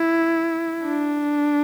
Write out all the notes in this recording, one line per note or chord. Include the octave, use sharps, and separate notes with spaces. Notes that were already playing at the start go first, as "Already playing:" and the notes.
Already playing: E4
D4